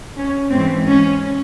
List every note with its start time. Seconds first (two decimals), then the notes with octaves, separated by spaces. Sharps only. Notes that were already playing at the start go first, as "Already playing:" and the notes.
0.17 C#4
0.51 G#2 E3 C4
0.86 C#4